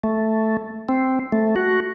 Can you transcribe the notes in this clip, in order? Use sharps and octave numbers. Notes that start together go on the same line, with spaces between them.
A3
C4
A3
F#4